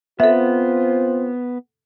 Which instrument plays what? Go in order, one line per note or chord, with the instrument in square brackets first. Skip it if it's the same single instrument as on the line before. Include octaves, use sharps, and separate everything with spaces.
[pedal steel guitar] B3 [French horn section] C4 F4 C5 [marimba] A4 E5